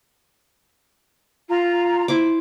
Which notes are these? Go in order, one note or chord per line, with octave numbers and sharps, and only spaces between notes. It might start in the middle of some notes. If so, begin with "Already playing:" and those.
F4 A#5
E4 C5 D6